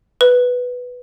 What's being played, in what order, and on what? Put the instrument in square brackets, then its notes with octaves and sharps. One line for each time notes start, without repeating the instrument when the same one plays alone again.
[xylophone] B4